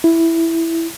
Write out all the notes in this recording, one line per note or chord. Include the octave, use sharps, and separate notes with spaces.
E4